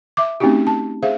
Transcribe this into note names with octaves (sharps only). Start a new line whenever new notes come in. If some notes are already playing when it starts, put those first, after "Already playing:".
E5 D6
A3 C4 C#4 D#4 F#4 G4
A5
G#4 C5 E5 F5